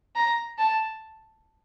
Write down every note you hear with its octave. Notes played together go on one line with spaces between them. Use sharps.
A#5
A5